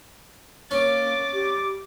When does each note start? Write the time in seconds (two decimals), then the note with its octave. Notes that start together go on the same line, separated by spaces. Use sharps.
0.71 A#3 C#4 D6 A6
1.33 G4